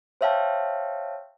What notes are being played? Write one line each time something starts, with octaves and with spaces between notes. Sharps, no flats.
C5 C#5 E5 F5 G5 A5